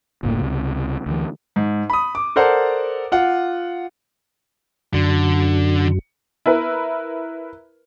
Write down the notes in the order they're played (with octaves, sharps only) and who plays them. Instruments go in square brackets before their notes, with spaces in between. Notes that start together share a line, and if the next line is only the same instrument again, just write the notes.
[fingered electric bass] F#1 D2 A2 A#3
C#2 C3
D2 E3
[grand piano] G#2
B5 D#6
D6
A4 A#4 C5 D5 F#5
F4 F#5
[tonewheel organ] F#2 [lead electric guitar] D3
[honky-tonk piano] E4 A#4 B4